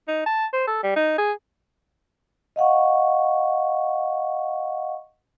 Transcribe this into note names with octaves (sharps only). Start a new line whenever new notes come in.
D#4
A5
C5
A4
G3
D#4
G#4
D#5 F5 F#5 C#6